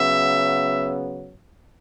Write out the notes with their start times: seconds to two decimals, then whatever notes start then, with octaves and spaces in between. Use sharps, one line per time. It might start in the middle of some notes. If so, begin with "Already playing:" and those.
Already playing: C#3 F#3 B3 E5